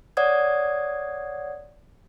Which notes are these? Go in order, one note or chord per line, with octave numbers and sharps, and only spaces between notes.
C#5 D5 F#5 D#6 G#6